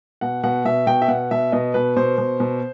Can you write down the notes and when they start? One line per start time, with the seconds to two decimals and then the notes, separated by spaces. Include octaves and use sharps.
0.21 B2 F#5
0.43 B2 F#5
0.65 B2 E5
0.87 B2 G5
1.02 E5
1.08 B2 F#5
1.31 B2 E5
1.52 B2 D#5
1.74 B2 B4
1.96 B2 C5
2.18 B2
2.40 B2